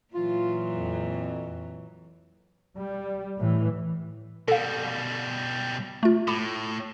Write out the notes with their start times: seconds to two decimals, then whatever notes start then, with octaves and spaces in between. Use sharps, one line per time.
0.14 A#2 E3 F#3 F4
0.74 F2
2.77 G3
3.38 A2 E3
4.48 B2 G3 A4 F5
6.03 A3 F4
6.28 A2 B5 D6